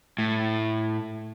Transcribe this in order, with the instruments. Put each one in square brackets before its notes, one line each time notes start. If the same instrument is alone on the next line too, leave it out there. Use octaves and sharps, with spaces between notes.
[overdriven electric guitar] A2